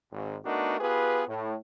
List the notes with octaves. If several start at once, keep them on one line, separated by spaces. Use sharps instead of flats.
G#1
A3 B3 D4 D#4 F#4 A#4
B3 F4 G4 G#4 B4
A2